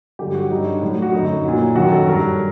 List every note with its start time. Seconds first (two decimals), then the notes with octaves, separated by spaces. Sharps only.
0.19 G2 D3 F#3 G4
0.35 F#4
0.50 G2 F#3 D#4
0.67 D4
0.82 A2 F#3
1.02 F#4
1.12 F#2 D3 F#3 D#4
1.45 A#2 F#3
1.76 F#2 D#3 F#3 F#4
1.91 A4
2.06 G2 F#3 A#4